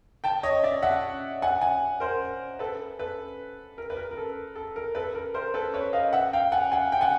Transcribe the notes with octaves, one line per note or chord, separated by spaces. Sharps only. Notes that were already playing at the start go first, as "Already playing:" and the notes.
G5 A5
C#5 D#5
D5 E5
E5 F#5
F#5 G#5
F#5 G#5
A#4 C5
A4 B4
A4 B4
A#4
B4
A#4
A#4
A4
A4
A#4
A4 B4
A#4
A#4 C5
A4 B4
B4 C#5
D#5 F5
E5 F#5
F5 G5
F#5 G#5
F#5 G#5
G5
F#5 G#5